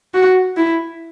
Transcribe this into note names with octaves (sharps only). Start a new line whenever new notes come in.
F#4
E4